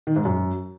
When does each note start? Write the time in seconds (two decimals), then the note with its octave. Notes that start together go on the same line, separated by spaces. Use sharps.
0.07 D#3
0.16 G#2
0.25 F#2